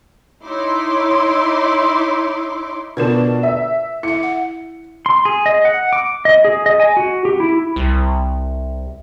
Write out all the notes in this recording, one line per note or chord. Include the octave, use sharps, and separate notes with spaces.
D#4 E4 C#5 C6 D6
B2 D4 F4 A#4 B4 E7
E5
E4 E5 C#7
F#5
C6
G#4
D#5
F#5
D6
D#5
G#4
D#5
G#5
F#4
G4
E4
C2